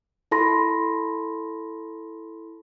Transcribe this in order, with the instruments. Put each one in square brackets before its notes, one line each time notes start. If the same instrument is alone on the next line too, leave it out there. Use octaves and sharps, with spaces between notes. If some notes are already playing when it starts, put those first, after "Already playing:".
[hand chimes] E4 A4 A5 B5 C6 A#6